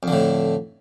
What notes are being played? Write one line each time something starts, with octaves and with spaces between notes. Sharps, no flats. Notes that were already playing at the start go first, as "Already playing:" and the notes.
F2 A2 D3